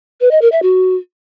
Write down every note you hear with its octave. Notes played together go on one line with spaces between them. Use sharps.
B4
D#5
A#4
E5
F#4